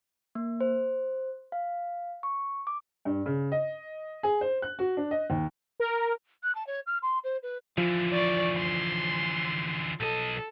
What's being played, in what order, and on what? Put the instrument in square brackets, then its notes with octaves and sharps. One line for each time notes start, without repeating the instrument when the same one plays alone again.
[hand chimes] A#3
C5
F5
C#6
D6
[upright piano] G2
C#3
D#5
G#4
C5
F#6
F#4
D4
D#5
D#2
[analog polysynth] A#4
[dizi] F#6
A5
C#5
F6
C6
C5
B4
[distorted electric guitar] D3 E3 [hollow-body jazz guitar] F3
[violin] D5 C#6
C6
[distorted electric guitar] B1 D#5 [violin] A4